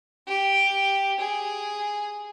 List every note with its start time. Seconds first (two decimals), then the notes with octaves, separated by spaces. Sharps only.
0.27 G4
1.20 G#4